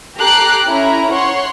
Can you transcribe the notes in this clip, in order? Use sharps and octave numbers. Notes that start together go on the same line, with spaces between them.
G4 A4 A#5 D6 F#6 C7
C#4 E4 A#5
C#5 F#5 C6